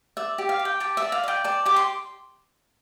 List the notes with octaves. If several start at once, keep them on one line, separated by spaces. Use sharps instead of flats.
D5 E5
G4
F5
G4
G5
G4 A5
E5
D5
F5
D5 G5
D5 A5
G4 D6
C6